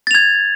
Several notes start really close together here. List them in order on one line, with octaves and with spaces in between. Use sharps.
A6 F7 G#6